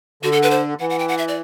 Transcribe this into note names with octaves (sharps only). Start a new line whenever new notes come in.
D3 F#4
A4
B4
C5
E3 F#5
F#5
G5
F#5
E5
D5